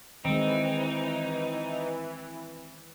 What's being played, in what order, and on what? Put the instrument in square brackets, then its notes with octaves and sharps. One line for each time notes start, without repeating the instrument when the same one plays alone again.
[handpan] D#3 G#3 [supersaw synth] E3 [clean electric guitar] C4 [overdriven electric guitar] D#4